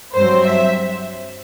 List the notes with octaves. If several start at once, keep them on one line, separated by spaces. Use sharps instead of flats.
G2 F#3 C4 C5
E5